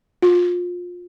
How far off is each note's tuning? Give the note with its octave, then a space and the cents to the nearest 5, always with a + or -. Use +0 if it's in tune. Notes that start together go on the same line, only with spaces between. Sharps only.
F4 +25